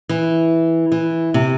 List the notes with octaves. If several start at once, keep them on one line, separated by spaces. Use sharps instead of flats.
E3
E3
C3